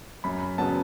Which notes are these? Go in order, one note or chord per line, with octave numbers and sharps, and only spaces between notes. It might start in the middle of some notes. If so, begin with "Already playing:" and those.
F#2 B5
C#3 F#3 B3 A5